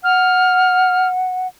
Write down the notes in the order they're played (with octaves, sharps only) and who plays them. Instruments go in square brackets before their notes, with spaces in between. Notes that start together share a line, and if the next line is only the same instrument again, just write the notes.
[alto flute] F#5 [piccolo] F6